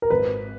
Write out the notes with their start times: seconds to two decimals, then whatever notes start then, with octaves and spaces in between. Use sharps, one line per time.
0.02 A#4
0.10 G#1 B4